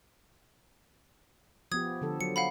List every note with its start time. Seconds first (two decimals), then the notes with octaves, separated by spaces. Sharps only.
1.72 F3 B3 G4 D#6 G#6
2.02 D3 F3 A4
2.21 F#3 C#7
2.36 F5 F#5 B5